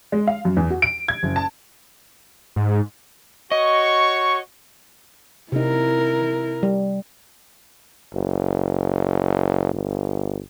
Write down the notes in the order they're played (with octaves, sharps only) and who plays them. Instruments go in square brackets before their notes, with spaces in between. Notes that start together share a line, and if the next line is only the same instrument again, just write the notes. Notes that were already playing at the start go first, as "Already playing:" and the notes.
[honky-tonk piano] G#3
F5
F#2
E2
F#4
D7
G#6
F#1
A5
[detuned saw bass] G#2
[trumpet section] F#4 C#5 C#6 [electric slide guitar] D#5
[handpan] C3 D#4 [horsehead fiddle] E4 A#4
[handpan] G3
[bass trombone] F#1
G1